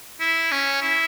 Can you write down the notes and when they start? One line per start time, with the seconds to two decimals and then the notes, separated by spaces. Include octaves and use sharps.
0.20 E4
0.51 C#4
0.82 E4